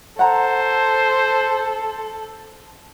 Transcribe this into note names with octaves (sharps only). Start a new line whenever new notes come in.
A4 C5 F#5 A#5